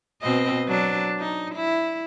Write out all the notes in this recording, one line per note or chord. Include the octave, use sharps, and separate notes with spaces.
B2 C4 D#5
F#3 D4
D#4
E4